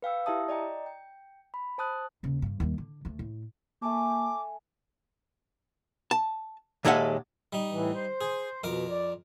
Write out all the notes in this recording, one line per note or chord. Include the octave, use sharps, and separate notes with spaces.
B4 F5 G5 E6
E4 G4 E5 A5 D#6
D5 D#5 G5 A#5
G5
B5
C5 A5 D#6 F#6
D#2 C#3
G2 D3
D#2 G3
D3
D2 A3
A2
A3 A#3 G#5 A5 D6
A5
D#2 A#2 G#3 A4 E5 F#5
G3 D#4
A2 E3
C5
G#4
F2 B2 A#4 D6
D5